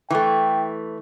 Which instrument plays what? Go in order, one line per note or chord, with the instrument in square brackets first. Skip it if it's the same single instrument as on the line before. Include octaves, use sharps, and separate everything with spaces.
[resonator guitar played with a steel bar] E3 A3 [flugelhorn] G5